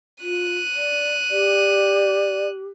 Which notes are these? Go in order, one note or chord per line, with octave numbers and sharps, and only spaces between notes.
F4 F#6 D#7
D5
G4 D5